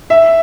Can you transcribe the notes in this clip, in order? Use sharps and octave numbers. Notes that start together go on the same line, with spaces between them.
E5